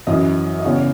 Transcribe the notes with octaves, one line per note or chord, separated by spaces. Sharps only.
F#2 E3 D#5
D#5
E2 C#3 E3 C#5